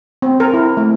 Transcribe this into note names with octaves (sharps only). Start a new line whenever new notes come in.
C4
A#4
E4
A3